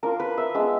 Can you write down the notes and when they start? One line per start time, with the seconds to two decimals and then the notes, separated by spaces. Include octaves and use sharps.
0.03 A#3 D4 F4 A#4
0.20 B4
0.38 E5
0.54 G#3 B3 D4 E5